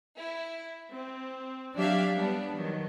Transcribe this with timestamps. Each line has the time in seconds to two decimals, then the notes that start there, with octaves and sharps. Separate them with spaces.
0.19 E4
0.92 C4
1.76 F#3 D4 G4 D5 E5 F5
2.15 G3 B3 D4
2.53 D#3 F#3